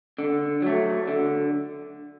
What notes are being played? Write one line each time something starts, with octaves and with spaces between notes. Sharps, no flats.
D3
F#3 A3
D3